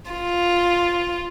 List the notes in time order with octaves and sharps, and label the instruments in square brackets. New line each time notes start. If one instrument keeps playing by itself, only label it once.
[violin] F4